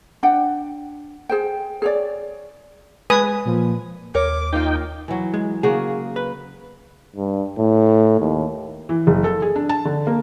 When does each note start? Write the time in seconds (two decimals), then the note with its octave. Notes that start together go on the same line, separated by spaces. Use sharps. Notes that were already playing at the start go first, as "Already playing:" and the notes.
0.23 D4 F#5 G5
1.29 G#4 C5 G5
1.82 G#4 C#5 D5
3.10 G#3 B4 G#5 D#6
3.45 A#2 F3
4.15 D#2 A#4 C#5 D6
4.53 D#3 A#3 D#4 F4 G5
5.08 E3 F#3
5.34 G#3
5.63 C#3 A#3 F#4 G#4
6.16 B4
7.16 G2
7.58 A2
8.20 D#2
8.89 E3
9.07 F#1
9.24 A4
9.42 G#4
9.56 D4
9.69 A5
9.85 D3
10.07 A#3